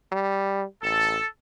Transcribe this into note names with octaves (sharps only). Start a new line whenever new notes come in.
G3
A1 A4